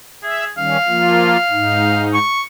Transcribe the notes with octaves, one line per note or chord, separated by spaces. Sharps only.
G#4 E5
D#3 G3 C#4 F5
F3 A#3 F4
G#2 D#4
C#6